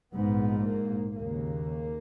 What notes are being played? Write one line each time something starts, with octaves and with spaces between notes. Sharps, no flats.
A#1 G#2 B3
A#3
D#2 C#3 A#3